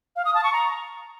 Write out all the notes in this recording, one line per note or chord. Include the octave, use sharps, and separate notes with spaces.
F5
D#6
A5
C#6
A#5